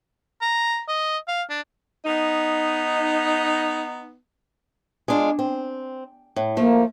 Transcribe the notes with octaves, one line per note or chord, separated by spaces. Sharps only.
A#5
D#5
F5
D4
B3 D#4
G#3 D4 F4
C4
A2
F3 A3 A#3